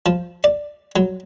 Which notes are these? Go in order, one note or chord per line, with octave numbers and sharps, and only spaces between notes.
F3
D5
F#3